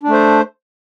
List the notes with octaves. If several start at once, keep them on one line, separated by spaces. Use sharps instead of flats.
A3 D4 C5